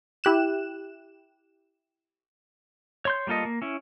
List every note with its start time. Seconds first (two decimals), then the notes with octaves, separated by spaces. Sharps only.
0.24 E4 G4 F#6 E7
3.05 C#5 C6 G6
3.27 G3 A#3 F4 A4 D#5
3.45 A#3
3.62 C#4 E4